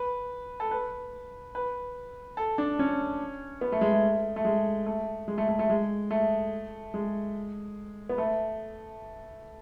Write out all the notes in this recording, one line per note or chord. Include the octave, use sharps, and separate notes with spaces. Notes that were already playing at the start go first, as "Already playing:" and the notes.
Already playing: B4
A4
B4
B4
A4
D4
C#4
B3
A3
G#3
A3
A3
G#3
A3
G#3
A3
A3
A3
G#3
A3
G#3
B3
A3